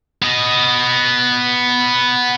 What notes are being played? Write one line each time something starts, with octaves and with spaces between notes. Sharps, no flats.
B3 D#5